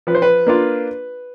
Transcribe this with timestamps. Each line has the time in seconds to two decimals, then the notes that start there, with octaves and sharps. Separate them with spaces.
0.07 F3 B4
0.15 C5
0.22 B4
0.47 A#3 D4 F4